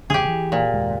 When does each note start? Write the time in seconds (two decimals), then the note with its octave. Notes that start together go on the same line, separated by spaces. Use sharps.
0.10 E1 C#2 D3 G4 G#4
0.24 D3 E3
0.52 A#2
0.73 F#1 D#2 G#3